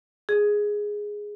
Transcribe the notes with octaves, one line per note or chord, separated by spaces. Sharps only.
G#4